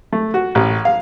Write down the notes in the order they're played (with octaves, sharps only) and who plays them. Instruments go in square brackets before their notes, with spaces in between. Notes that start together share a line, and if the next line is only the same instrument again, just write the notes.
[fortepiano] A3
F#4
A1
F5